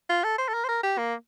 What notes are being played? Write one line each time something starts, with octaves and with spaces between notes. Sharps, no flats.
F4
A4
C5
A4
A#4
C5
A#4
G4
A#3